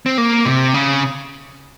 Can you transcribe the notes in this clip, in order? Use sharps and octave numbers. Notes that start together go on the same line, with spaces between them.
C4
A#3
C3
C#3